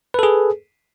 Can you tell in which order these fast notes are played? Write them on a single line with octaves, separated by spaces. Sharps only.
B4 A4 G#4